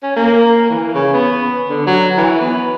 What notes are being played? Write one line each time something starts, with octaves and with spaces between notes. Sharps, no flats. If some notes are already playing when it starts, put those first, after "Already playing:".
C#4
A#3
E3
C#3
B3
D3
F#3
E3
B3